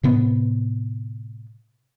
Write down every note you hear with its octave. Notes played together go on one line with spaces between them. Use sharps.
A2 C3 B3